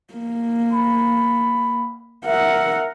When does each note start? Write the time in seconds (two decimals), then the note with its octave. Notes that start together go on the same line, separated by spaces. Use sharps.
0.14 A#3
0.73 B5
2.26 A#4 E5 F#5